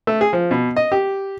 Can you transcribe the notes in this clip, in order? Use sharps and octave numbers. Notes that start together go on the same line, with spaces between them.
A3
G#4
F3
B2
D#5
G4